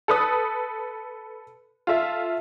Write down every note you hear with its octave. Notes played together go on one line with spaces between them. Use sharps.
A4 B4 D#6
F4 A4 E5